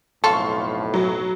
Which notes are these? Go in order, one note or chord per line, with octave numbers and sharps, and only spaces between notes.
B1 F2 A2 A4 F5 C6 C#6
F#3